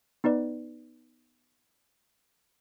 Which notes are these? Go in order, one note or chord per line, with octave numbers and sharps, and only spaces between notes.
B3 D#4 B4 D5